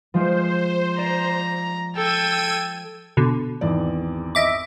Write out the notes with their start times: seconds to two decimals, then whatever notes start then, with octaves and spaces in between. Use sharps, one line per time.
0.14 F3 G#3 F4 C5
0.98 D5 A#5
1.95 A4 G5 E6 G#6 D#7
3.17 B2 D3
3.61 G#1 E2 D5
4.35 D#5 E5 D6